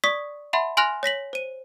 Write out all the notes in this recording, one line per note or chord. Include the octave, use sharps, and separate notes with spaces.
D5 C#6 D#6 B6
E5 F#5 A5 B5 C6
G#5 C6 F6 F#6 A#6 F7
C#5 A#6 B6 F#7
C5 D#7